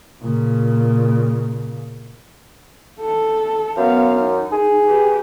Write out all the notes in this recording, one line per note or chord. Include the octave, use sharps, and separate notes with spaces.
A#2 C#3
A4
F#2 B3 F5
D#4
G#4
G4 B4